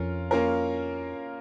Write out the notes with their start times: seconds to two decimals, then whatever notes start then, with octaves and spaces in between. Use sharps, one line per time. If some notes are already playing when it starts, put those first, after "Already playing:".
Already playing: F2 C#4 F4 A#4
0.31 A#3 C#4 F4 A#4